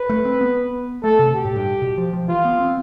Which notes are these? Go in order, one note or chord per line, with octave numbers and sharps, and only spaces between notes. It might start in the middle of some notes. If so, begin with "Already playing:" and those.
Already playing: B4
A3
C4
B3
A3 A4
C3
B2 G4
A2
G2
B2
F3
F3
E3 F4
B3
C4